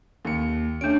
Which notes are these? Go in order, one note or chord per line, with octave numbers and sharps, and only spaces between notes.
D#2 C#7
A3 C#4 D4 D7